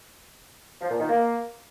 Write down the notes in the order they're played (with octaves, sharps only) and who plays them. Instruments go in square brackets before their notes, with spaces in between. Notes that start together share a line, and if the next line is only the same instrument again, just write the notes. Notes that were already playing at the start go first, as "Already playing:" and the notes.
[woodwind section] F3
A#2
D#3
A#3